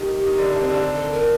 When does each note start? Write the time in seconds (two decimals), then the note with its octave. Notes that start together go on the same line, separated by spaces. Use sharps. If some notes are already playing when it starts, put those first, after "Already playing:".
Already playing: D#3 D#4 G4
0.27 D#3 D#4
0.38 D3 D4
0.50 D4
0.60 C4
0.70 D3 D4
0.96 A4
1.12 A#4